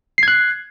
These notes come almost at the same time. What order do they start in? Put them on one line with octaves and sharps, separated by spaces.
C7 G#6 F#6